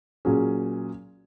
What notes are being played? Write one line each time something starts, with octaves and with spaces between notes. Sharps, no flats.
A#2 F#3 C#4 G#4